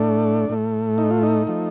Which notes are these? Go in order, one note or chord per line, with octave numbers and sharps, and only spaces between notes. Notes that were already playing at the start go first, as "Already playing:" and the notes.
Already playing: A2 A3 D4
A2 A3
D#4
F4
D#4
F3 A3